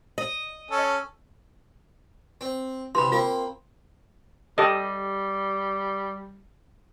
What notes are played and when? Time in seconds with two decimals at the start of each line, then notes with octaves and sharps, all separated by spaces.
0.18 D#5
0.71 C#4 A4
2.41 C4
2.95 C3 E3 B5 C6
3.12 A#3 C4 F4
4.58 G3 G4 A4 D#5